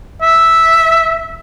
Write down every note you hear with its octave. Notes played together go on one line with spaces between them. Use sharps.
E5